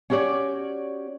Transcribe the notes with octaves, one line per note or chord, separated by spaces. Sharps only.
C#4 F#4 G4 C#5 D5